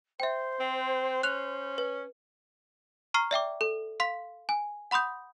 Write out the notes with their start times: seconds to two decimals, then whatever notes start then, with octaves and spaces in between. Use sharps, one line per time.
0.20 C5 E5 G5
0.60 C4
1.23 C#4 F#6 F7
1.78 B4
3.14 A#5 C#6 F6 C7
3.31 D5 E5 G5 D6
3.61 A4
4.00 F5 C6 B6
4.49 G#5
4.91 F#5 B5 C6 D#6 G6